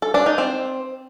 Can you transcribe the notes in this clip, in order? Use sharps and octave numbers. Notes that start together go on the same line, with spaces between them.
A4
D4
D#4
C4